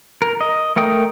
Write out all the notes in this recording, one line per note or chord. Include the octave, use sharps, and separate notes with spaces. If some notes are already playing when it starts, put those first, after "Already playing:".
A#4
D#5
A3 A#4 G5 D#6